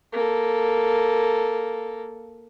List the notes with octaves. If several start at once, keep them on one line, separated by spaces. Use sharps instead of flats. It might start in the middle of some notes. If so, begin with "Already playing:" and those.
A#3 A4